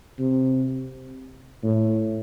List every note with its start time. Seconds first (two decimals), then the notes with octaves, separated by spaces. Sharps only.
0.19 C3
1.63 A2